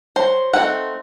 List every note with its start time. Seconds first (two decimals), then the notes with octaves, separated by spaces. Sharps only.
0.16 F#3 C5
0.53 A3 C4 D#4 F#5